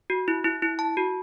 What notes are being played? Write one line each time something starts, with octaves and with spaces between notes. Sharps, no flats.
F#4
E4
E4
E4
A5
F#4